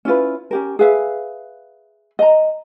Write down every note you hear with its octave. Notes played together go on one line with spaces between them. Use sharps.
C#4 E4 F4 B4
C#4 G4 A#4
G#4 B4 E5 F5
D#5 A#5